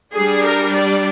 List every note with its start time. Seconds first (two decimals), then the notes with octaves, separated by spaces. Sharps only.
0.13 G3 D4 G#4
0.44 A#4
0.75 D5